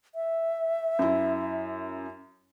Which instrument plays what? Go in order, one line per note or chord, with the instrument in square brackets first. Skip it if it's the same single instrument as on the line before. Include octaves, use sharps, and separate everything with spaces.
[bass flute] E5
[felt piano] F#2 E4